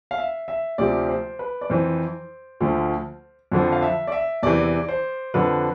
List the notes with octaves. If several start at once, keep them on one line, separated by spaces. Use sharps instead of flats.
F5
E5
E5
D2 C3 F3 D5
C5
B4
D5
F2 E3 C5
D2 D3 F3
F2 D3 F3
F5
E5
D5
E5
E2 C3 E3 D5
C5
F2 D3 F3 B4